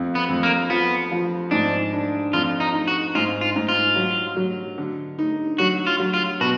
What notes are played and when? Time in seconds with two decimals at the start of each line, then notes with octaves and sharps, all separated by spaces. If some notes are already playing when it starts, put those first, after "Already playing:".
Already playing: F2
0.15 B3
0.29 F2
0.43 A#3
0.70 F3 B3
1.11 F3
1.51 G#2 D4
1.93 D4
2.33 F2 F4
2.60 D#4
2.73 D#4
2.87 F#4
3.15 G#2 F4
3.41 F4
3.56 G#2
3.69 F4
3.96 F#3
4.36 F#3
4.78 D3
5.19 D#4
5.58 F#3 F#4
5.87 F4
6.00 F#3
6.14 F4
6.41 B2 F#4